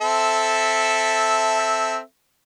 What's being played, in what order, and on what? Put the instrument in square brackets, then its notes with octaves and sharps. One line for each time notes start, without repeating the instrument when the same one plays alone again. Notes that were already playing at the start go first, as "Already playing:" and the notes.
[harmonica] C4 A4 E5